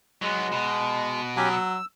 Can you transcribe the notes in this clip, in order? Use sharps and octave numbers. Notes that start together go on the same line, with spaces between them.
F#3 G#3 B3
B2
F#3 C#4 G4 G#5
E6